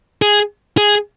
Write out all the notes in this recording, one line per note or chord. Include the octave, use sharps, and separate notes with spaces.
G#4
G#4